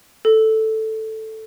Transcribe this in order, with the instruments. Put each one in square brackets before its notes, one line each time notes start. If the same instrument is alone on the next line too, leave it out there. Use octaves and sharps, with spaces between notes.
[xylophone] A4